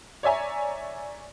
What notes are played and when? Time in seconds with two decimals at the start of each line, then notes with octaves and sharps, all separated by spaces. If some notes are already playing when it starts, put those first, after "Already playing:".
0.23 C#5 D5 E5 G#5 A#5